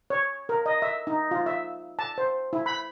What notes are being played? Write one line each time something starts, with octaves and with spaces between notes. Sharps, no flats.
C#5
A#4
D#5
E5
D#4
F4
E5
A5
C5
E4
B5